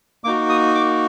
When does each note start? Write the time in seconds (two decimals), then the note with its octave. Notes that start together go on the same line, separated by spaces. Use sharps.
0.24 A#3 D#4 F#4 D6
0.49 D#6
0.75 D6